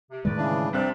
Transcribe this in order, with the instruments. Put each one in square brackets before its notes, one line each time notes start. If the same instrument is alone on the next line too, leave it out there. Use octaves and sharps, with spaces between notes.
[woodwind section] C3
[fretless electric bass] A2 D#3 G#3 [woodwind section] B4 D5
[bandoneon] C#3 E3 D4
[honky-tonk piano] C2 D4 F#6 [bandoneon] C4